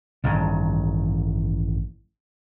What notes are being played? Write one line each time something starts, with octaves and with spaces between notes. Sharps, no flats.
A1 G2 D#3